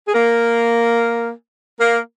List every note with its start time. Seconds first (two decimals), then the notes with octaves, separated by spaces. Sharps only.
0.07 G#4
0.14 A#3 A#4
1.79 A#3 A#4